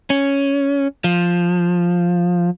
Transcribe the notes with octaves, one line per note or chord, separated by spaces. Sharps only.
C#4
F3